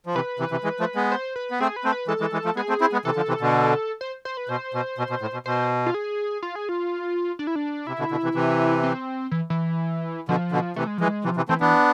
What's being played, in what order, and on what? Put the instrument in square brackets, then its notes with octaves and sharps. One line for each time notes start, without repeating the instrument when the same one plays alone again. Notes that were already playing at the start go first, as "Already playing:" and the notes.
[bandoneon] F3
[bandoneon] C3 E3 [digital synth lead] B4
[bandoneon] C3 E3
C3 E3
E3 G#3
F3 A3
G#3 B3
[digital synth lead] C5
B4
[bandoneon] B3
[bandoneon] A3 C4 [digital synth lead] G#4
[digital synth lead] B4
[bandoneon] A3 C4
[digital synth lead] B4
[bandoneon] E3 G#3 [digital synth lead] A4
[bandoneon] E3 G#3
E3 G#3
F3 A3
[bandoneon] G#3 B3 [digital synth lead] G#4
[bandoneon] A3 C4
C4 E4
G#3 B3
[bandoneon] C3 E3 [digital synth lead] A4
[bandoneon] D3 F3
C3 E3
B2 D3
[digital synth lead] C5
C5
B4
[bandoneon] B2 [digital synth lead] C5
[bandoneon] B2
B2
B2
A2
B2
[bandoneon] B2 [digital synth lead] C5
[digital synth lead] F4
G#4
F4
G#4
F4
D4
E4
D4
[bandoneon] C3 [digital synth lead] E4
[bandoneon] B2 D3
B2 D3
C3 E3
C3 E3
[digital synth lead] C4
E3
E3
[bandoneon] B2 D3 [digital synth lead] F3
[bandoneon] B2 D3
[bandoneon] C3 E3 [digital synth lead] A3
[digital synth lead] G#3
[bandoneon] E3 G#3 [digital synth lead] F3
[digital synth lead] G#3
[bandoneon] C3 E3 [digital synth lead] F3
[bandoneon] C3 E3
[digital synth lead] E3 [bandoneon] A3 C4
[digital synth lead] E3 [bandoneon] B3 D4